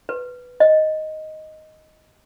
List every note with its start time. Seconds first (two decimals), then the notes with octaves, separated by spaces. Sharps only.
0.09 B4
0.60 D#5